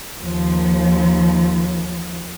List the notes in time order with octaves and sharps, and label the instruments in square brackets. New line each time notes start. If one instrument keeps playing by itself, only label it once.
[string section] D#2 F3